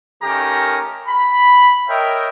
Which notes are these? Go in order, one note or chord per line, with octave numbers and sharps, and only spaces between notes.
D#3 A3 C#4 G4 A#4 A#5
B5
A#4 C#5 D#5 E5 G5